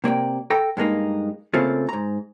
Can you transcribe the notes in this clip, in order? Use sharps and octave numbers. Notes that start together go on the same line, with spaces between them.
C3 A#3 D5 G5
A4 G5 A#5
G2 G#3 A#3 D#4
C#3 A3 A#3 C4 F4 A4
G#2 A#5